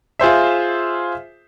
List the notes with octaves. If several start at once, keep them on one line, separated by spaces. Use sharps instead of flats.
F4 G#4 C5 E5